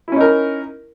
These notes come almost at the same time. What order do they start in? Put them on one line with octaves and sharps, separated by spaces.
E4 C#4 D#4 A#4